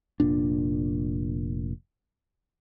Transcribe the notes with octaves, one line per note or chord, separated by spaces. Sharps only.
F1 A#2 D4